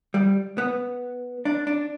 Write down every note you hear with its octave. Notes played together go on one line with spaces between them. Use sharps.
G3
B3
D4
D4